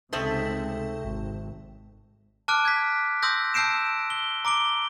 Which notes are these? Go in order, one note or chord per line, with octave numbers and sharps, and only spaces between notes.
C#2 C3 G#3 A3 C4 D#4 A4 E5
G#1
A5 D6 F6 F#6 D7
G#6 B6
C6 D#6 E6 G6 A#6
A5 E6 G6 C7 D7 E7
G7
A#5 D6 D7 G7